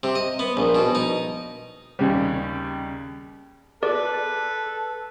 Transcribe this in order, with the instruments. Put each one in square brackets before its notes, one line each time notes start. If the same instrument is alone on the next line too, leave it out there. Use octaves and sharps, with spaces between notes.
[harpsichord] C3
D#5
B3
A#1
B2
D#4
[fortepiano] D#2 C#3 G3
[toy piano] G#4 [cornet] A4 [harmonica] B4 [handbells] D5